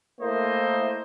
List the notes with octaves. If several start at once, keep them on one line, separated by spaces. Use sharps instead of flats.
A3 A#3 E4 A#4 C5 D#5